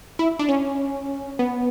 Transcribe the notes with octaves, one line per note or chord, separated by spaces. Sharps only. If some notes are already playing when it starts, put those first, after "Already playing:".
E4
D4
C#4
B3